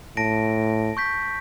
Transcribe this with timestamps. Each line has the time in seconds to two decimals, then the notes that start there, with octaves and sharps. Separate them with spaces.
0.17 A2 A5 A#6 D7
0.97 C#6 G6 B6